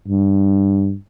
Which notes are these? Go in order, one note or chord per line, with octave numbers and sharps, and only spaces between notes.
G2